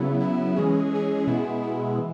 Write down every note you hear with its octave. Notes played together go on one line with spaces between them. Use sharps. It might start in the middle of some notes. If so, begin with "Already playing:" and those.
Already playing: C#3 F#3 B3 E4
C#3 F#3 B3 E4
E3 G#3 C#4 G#4
E3 G#3 C#4 G#4
B2 G#3 B3 E4 G#4
B2 G#3 B3 E4 G#4
E3